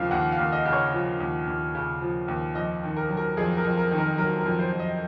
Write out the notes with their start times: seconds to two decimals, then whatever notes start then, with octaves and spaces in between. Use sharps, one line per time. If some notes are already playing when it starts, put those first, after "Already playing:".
Already playing: D#2 C#3 F3 F5
0.11 D#2 F#5
0.32 F5
0.39 D#2
0.52 D#5
0.65 C#3
0.73 C#5
0.93 F3
1.20 D#2
1.47 D#2
1.75 C#3
2.01 F3
2.28 D#2
2.55 F2 D#5
2.83 D#3
2.97 A#4
3.09 F#3
3.17 A#4
3.37 F2 G#4
3.57 A#4
3.64 F2
3.77 A#4
3.91 D#3
3.98 A#4
4.18 F#3 A#4
4.39 A#4
4.45 F2
4.59 C5
4.72 F2
4.79 D#5